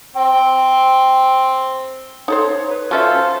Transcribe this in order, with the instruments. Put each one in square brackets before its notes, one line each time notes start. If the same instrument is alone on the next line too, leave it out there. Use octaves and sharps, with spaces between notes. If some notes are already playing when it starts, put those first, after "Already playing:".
[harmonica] C4 G5
[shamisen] D#4 A4 C5 [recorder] C#5
[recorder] B4
[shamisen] F#3 C#4 E5 [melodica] F4 A4 [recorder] C5